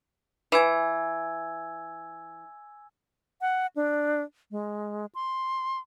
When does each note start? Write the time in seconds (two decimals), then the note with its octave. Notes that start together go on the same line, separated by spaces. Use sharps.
0.52 E3 G#5 E6 G#6
3.41 F#5
3.76 D4
4.51 G#3
5.15 C6